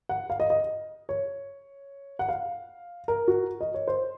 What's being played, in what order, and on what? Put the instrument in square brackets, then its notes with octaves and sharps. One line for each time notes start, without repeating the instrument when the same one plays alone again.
[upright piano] F#5
F5
D#5
D#5
C#5
F#5
F5
A#4
F#4
D#5
C#5
C5